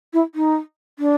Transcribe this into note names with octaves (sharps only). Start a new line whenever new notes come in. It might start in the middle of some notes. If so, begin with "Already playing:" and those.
E4
D#4
D4